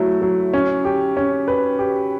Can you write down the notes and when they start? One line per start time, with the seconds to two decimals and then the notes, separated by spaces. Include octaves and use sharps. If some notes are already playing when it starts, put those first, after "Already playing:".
Already playing: F#3 A3 E4
0.22 F#3
0.54 C#4
0.85 G4
1.17 C#4
1.48 B4
1.79 G4